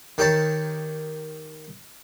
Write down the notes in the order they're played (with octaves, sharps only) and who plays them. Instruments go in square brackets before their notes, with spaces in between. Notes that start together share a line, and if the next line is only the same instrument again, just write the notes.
[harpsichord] D#3 G4 C#5 A5